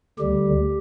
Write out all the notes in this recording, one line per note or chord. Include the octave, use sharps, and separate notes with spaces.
D2 D3 G3 G4